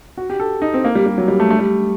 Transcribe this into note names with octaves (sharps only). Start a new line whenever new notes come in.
F#4
G4
A4
D#4
C4
A#3
G3
G3
F#3
G3
A3
A3
G3